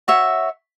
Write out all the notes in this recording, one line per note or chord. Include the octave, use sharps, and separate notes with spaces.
F#4 C#5 E5